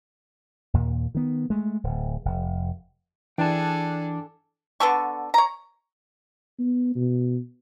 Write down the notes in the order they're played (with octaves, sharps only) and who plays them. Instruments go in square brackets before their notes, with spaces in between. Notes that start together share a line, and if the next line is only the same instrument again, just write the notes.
[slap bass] D#2 A#2
D#3 B3
G#3 A3
D1
F1
[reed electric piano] E3 [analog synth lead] D4 [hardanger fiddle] G#4 A4 [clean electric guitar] G5 A5
[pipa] D3 B3 A4 C#6
C#5 A#5
[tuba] B3
B2